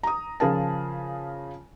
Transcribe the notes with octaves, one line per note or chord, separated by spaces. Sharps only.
A#5 D#6
C#3 F3 G#4 A#4 A5